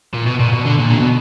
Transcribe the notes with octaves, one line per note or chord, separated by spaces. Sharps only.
A#2
B2
A#2
B2
D3
A#2
D3
B2